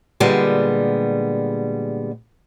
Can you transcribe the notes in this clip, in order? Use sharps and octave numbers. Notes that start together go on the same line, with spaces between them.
A#2 D3 G3 G#3 B3